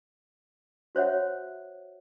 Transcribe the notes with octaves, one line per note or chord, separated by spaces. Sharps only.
F#4 C5 C#5 E5 F#5